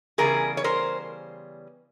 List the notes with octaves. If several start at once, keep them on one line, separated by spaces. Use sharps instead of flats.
C#3 E3 G3 B3 G#4 A#4
C#5
A#4 C5